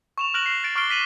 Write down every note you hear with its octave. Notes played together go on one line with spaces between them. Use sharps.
C#6 E7 F7
F6 F#6 A#6 D7 F#7
C7
A6 D7
C#6 D6 F6 C7 D7 G7
D6 B6 D#7 E7 F#7